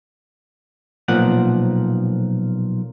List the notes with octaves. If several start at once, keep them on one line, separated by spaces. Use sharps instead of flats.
B1 A#2 F3 F#5